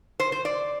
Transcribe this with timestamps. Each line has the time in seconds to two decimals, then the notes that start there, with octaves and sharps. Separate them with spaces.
0.20 C5
0.32 C5
0.45 D5